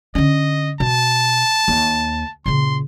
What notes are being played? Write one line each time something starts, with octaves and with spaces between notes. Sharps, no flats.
D3 C#4 D#5
B2 A5
D#2
A#2 C#3 C6